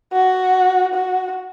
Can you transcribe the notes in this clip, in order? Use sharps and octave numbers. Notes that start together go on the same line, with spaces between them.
F#4
F#4